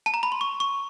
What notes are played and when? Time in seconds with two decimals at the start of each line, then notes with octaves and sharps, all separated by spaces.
0.06 A5
0.14 A#5
0.23 B5
0.32 C6
0.41 C#6
0.60 C#6